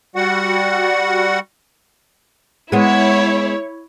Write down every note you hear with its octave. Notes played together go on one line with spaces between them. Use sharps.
G3 F#4 F#5
G#3 B3 E4 C#5